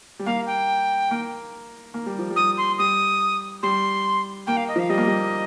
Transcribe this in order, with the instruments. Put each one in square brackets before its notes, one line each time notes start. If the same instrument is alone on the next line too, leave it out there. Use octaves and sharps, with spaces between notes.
[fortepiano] G3
[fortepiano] A#3 [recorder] F5
[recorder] G5
[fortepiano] A#3
A#3
G3
F3
G3
[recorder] D#6
C6
[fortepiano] G3 [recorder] D#6
[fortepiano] G3 [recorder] C6
[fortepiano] A#3 [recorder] G5
[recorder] F5
D#5
[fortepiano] F3 [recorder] F5
[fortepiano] G3 [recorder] D#5
[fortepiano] A#3
G3